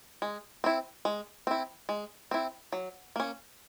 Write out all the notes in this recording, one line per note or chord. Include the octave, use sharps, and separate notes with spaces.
G#3
C4 E4
G#3
C4 E4
G#3
C4 E4
F#3
A#3 C#4